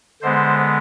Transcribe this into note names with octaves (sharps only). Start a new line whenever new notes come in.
D3 G#3 B3 C5